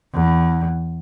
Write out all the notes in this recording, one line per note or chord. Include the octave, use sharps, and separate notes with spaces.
E2